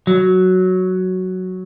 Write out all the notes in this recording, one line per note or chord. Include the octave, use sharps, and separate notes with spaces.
F#3